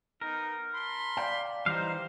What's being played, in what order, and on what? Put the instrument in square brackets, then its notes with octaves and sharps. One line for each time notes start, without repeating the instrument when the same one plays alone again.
[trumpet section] B3 D#4 [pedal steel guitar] A#4
[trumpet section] A5 B5 C6
[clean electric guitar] D5 F5 G5
[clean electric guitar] E3 G3 [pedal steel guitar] D#4 F5 [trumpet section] C5